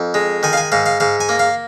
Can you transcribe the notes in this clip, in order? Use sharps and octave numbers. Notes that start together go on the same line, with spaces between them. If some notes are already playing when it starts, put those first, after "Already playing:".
Already playing: F2
G#3
D#3 G#5
F5
G#5
G#2 F5
F5
G#2 F5
G#5
A#3
F5